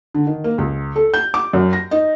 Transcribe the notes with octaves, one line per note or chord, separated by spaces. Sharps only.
D3
D#3
A#3
C#2
A4
G6
D6
F#2
A#6
D#4